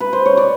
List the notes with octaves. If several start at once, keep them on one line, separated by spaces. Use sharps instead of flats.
B4
C5
C#5
D5